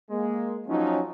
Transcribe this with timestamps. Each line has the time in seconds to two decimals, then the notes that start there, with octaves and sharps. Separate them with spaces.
0.10 G#3 A#3
0.68 F3 F#3 C#4 D#4